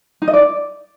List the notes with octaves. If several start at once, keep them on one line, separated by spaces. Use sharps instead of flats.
D#4
D#5
D5